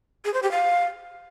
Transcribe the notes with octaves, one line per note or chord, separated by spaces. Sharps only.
G#4
C5
G4
F5